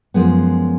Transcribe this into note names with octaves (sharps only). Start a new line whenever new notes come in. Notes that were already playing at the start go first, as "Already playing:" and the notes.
F#2 F3 G#3 B3